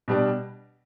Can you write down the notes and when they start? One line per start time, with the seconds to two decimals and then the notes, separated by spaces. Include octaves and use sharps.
0.08 B2 G3 D4